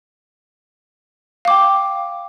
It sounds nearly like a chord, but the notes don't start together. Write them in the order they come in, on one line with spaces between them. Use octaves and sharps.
F5 D6 G5